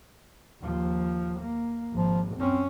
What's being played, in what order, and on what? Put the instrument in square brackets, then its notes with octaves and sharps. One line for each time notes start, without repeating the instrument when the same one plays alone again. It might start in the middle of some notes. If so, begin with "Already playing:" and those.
[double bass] D#2 F3
A#3
[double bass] G#1 [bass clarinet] F3
[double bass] F#2 C#4 [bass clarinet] C4